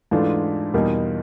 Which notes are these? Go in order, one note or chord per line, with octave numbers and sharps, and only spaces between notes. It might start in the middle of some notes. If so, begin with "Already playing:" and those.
G#2 E3 A3 D4 F4
E2 B2 G3 A#3 D#4